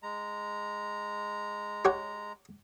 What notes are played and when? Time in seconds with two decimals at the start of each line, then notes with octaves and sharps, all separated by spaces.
0.03 G#3 A#5
1.85 G4 C#5 F#5